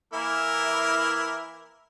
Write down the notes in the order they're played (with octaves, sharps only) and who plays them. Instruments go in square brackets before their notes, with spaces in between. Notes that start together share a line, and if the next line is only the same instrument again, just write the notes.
[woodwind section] E3 A#3 E4 [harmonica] A#4